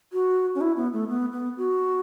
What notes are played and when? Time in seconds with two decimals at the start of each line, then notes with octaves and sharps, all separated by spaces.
0.13 F#4
0.55 C#4
0.61 E4
0.77 B3
0.93 A3
1.09 B3
1.32 B3
1.57 F#4